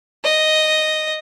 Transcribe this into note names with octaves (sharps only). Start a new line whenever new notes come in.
D#5